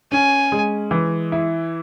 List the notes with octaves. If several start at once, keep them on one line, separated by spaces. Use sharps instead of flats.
C#4 G#5
G#3
E3
E4